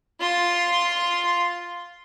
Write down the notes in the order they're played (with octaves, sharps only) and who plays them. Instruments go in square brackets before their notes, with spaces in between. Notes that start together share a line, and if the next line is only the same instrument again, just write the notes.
[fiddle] F4 C6